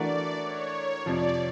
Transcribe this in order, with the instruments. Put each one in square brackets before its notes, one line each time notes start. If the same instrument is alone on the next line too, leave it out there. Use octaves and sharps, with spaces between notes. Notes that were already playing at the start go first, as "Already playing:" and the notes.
Already playing: [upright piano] E3 A3 D4 F#4 A#4 [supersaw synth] D5
[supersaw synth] C#5
[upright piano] F2 C3 F3 [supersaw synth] D5